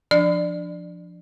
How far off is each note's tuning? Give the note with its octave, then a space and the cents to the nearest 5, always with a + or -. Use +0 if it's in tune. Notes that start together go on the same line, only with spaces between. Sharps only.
F3 +0 D4 +0 D5 +15